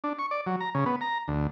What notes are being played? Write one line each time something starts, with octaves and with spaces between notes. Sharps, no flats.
D4
C#6
D5
F#3
A#5
C#3
B3
A#5
D2